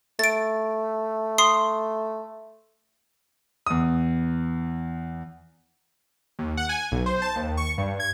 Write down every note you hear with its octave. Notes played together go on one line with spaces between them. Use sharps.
A3 A6 D7
C6 D#6 C7
E2 D#6
D#2
F#5
G#5
B1
C5
A5
D#2
C#6
G2
G#6